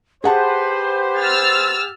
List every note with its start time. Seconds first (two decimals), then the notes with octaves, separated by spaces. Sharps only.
0.24 G4 G#4 B4 C5 F#5 A5
1.18 E6 F6 A6